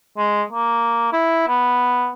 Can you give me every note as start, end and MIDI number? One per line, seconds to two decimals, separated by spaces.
0.18 0.43 56
0.52 1.10 58
1.13 1.45 64
1.48 2.09 59